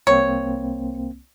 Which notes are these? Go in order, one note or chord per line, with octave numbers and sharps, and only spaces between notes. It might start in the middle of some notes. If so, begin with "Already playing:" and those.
C2 A#3 C4 C#5